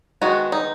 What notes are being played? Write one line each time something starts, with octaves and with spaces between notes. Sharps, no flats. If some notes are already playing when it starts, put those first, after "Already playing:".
D#3 G#3 B3 D#4 F#4
D#4